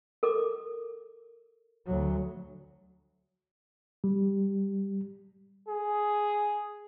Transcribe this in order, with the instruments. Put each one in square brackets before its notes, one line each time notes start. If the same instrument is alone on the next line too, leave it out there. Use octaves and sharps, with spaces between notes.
[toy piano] A4 A#4 D6
[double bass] D2 F#3
[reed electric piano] G3
[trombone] G#4